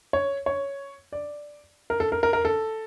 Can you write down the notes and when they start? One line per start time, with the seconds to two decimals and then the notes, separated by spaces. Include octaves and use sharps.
0.13 C#5
0.46 C#5
1.12 D5
1.90 A#4
2.00 A4
2.12 A#4
2.23 A#4
2.33 A#4
2.45 A4